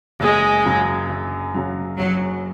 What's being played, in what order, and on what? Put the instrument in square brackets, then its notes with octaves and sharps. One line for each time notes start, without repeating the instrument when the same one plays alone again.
[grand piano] F#1 [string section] G#3
[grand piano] F#2 C#3 F#3
F#1
F#2 C#3 F#3
[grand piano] F#1 [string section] F#3